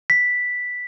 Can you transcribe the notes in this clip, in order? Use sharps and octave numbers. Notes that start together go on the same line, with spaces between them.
B6